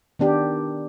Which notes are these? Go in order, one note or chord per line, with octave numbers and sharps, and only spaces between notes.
D#3 B3 D4 G4